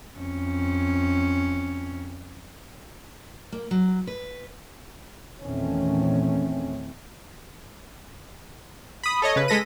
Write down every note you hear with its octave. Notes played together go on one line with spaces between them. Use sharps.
F2 C#4
A#3
F#3
B4
E2 A#2 D#3 A3 C4 C#4
B5 D#6
A4 C#5 D#5
C#3 B4
G#3 A4 A#6 B6 D#7